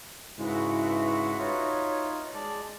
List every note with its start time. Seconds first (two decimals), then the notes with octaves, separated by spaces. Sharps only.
0.38 G#2 C#3 G#3 E4 F#4 B4 E5
1.39 D#4 F4 C#5
2.34 G#3 D5 A5